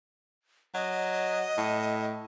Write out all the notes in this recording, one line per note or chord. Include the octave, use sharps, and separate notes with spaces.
F#3 D#5
A2